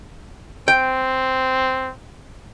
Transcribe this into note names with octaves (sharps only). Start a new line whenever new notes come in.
C4 G5